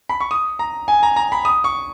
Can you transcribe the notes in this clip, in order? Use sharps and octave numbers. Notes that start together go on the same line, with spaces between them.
B5
C#6
D#6
A#5
G#5
A#5
A#5
B5
D#6
C#6